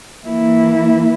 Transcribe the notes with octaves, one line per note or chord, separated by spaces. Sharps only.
E3 A#3 E4